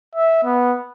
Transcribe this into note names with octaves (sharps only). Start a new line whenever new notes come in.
E5
B3